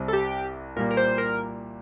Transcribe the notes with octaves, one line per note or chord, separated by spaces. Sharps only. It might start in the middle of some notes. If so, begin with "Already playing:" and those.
Already playing: C2 C3 G3 C4
A4
G4
A#2 G3 A#3 A#4
A#4
C5
A#4